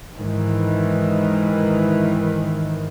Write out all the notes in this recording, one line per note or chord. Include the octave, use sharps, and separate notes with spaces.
G#2 D#3 E3